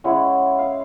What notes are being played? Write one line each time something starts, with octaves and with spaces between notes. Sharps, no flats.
G#3 C#4 E4 F#5
F5